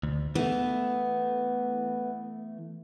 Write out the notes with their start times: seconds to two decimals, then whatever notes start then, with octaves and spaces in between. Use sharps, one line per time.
0.03 D2
0.35 E3 A3 B3